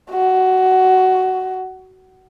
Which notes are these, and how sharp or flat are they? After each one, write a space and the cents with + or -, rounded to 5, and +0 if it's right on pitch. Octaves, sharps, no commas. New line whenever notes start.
F#4 +15